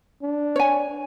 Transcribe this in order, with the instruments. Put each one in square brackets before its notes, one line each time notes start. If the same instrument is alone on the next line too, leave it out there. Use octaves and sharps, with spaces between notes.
[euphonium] D4
[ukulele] C#5 G#5